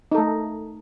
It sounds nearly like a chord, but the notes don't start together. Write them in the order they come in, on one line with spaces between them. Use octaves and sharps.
D#4 A4 A3